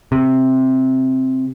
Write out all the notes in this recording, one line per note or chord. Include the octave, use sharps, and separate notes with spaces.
C3